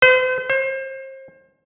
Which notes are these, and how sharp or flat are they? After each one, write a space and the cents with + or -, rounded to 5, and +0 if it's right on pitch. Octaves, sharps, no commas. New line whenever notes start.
C5 -40
C5 +35